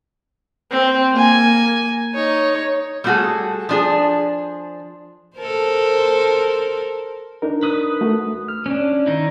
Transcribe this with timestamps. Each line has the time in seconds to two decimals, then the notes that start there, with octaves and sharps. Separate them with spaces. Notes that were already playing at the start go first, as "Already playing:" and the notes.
0.71 C4
1.13 A#3 G#5
2.15 D#4 C#5
3.04 G3 A3 B3 F#4 G#4 A4
3.69 F3 D4 G#4
5.37 A4 A#4 C5
7.42 D4 D#4 A#4
7.63 B4 D#6
8.01 A3 F#4
8.48 F6
8.66 C#4 D4
9.06 D#3 D#4 E4